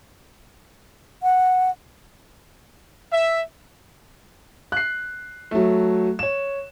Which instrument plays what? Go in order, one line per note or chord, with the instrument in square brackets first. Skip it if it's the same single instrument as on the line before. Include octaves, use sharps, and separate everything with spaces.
[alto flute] F#5
[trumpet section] E5
[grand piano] F#6 C7
F#3 A3
C#5 E7